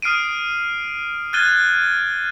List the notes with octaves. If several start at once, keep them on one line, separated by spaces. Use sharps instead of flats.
D#6 F6 C7 D7 D#7
F6 F#6 G#6 A6 D#7 G7